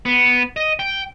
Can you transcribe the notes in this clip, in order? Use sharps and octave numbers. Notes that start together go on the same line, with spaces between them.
B3
D#5
G5